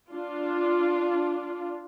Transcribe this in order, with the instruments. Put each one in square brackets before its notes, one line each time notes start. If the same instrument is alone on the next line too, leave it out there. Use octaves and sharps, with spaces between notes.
[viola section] D4 F4